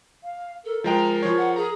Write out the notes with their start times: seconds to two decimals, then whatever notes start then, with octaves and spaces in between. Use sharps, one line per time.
0.24 F5
0.65 A4 A#4
0.84 F3 G#3 A#4 G5 A#5
1.23 F3 F4 G#4 C#5
1.37 F#5
1.56 G#4 A#5